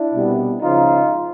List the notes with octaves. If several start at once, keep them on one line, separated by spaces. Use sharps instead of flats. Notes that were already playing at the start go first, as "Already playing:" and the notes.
Already playing: D4 E4
C2 B2 G3 B3
C#2 C#3 F3 D#4 F4